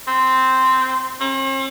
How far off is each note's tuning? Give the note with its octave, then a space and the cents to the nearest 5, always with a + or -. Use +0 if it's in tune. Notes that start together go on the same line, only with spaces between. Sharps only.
C4 -10
C4 +45